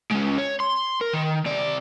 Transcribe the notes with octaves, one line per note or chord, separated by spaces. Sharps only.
G#3 C#4
C#5
C6
A#4
D#3
C3 D5